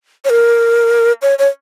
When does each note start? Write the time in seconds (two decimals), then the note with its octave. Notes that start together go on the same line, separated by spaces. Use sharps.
0.25 C#5
0.30 A#4
1.22 C#5
1.39 C#5